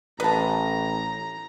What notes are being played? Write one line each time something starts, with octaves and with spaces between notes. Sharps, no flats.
A1 B4 A5 A#5